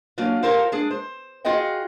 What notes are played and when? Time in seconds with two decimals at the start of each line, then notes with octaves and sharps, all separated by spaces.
0.18 F#3 A#3 C#4 D4 F4
0.43 F4 G4 A4 A#4 C5 F5
0.72 G#3 D4 G#4
0.91 C5
1.45 F4 F#4 G#4 D#5 G5